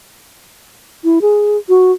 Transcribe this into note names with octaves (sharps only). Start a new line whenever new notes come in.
E4
G#4
F#4